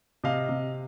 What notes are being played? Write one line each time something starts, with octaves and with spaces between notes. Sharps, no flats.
C3 D#5 F5
C3